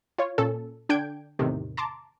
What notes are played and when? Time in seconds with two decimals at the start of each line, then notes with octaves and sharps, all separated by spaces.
0.18 F4 C#5
0.38 A#2 C#4 A4
0.89 D3 D4 G5 G6 G#6 D7
1.39 E2 A2 C3 D#3
1.77 A5 A#5 C6 D6